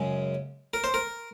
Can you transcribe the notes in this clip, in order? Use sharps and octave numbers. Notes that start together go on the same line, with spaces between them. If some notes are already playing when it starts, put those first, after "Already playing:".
Already playing: F#2 C#3 G#3
A#4
C5
A#4